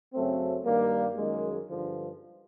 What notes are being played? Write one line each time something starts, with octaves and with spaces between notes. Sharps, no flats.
F#2 C#3 F#3 A3 C4
G2 D#3 G3 A#3
F#2 D#3 G#3
G2 D3 F3